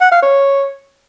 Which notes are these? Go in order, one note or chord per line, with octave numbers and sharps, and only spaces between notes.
F#5
F5
C#5